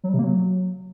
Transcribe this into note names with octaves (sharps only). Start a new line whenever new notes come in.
F#3
G3
C3
A#3
F#3